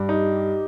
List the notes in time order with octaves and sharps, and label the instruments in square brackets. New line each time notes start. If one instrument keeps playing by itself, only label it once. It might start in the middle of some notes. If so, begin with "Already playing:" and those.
Already playing: [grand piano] G2 [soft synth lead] G4
[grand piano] D#4